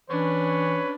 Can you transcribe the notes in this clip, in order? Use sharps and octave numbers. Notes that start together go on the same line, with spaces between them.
E3 C#4 D4 B4 C#5